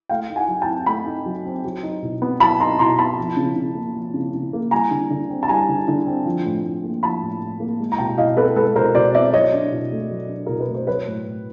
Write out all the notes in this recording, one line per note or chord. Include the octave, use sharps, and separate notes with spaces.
A3 F5 G5
D#4
F#5 G#5
F#3
G5 A5
C4
A3 A5 B5
D#4
F#3
C4
F#3
D#4
B2
B3
F#3 A5 B5
D#4 A#5 C6
B2 A#5 C6
B3 A5 B5
F3
C#3
C#3
A#3
F3
C#3
C#3
A#3
G3 G#5 A#5
D3
D3
C4
A5
G3 G#5 A#5
D3
D3
C4
F3
A2
A2
A#3
F3 A5 B5
A2
A2
A#3
G#3
A#5
B2 G5 A5
B2 D#5 F5
B3 A4 B4
G#3 A4 B4
B2 A#4 C5
B2 C5 D5
B3 D5 E5
F#3 C#5 D#5
D4
B2
A3
F#3
D4
B2 A#4
B4
A3
C5
F#3 B4 C#5
A2
A2